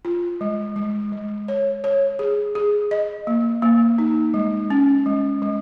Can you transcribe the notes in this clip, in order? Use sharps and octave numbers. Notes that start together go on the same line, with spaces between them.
F4
G#3
G#3
G#3
C#5
C#5
G#4
G#4
D#5
A#3
A#3
D#4
G#3
C#4
G#3
G#3